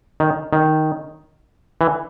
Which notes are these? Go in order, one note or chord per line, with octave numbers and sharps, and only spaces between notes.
D#3
D#3
E3